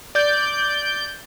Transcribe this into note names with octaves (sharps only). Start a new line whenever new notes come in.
D5 G6